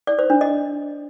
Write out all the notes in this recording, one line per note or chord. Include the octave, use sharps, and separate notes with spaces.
D5
C5
D4
D#5